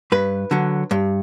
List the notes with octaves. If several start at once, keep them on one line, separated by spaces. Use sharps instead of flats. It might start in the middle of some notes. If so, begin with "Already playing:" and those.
G2 B4
D3 F#3
G2